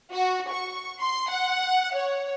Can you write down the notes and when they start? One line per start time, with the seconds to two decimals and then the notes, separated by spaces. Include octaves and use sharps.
0.12 F#4
0.51 C#6
1.00 C6
1.30 F#5
1.95 C#5